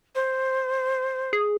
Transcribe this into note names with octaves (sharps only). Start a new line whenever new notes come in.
C5
G#4